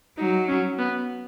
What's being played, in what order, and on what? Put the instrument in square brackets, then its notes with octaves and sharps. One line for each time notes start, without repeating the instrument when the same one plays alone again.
[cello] F#3 [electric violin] D#4
[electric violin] C#4
B3